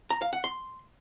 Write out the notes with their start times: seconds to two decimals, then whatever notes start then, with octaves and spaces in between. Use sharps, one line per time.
0.10 A#5
0.22 F5
0.33 F#5
0.44 C6